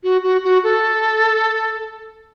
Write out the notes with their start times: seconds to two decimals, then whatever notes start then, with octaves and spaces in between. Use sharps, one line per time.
0.03 F#4
0.23 F#4
0.44 F#4
0.64 A4